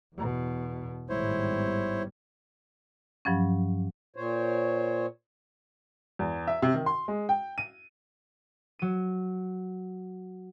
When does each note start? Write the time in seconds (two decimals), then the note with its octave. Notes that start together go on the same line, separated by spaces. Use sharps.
0.15 E2 B2
1.09 G#1 A2 G3 G#3 B3 E4 C5 C#5
3.25 G2 F3 F#3 C#4
4.16 A#2 C5 C#5
6.19 E2
6.47 E5
6.62 C3
6.74 D#3
6.86 C6
7.08 G#3
7.29 G5
7.58 D#7
8.79 F#3 D#7